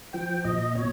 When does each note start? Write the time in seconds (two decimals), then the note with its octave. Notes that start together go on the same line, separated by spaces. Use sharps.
0.13 F3 G5
0.44 A#2 D#5
0.75 B2 C#5